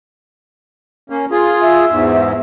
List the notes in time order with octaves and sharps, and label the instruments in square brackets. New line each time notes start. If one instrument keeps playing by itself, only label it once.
[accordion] A#3 C#4
F4 G#4
[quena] E5
[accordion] E2 G#2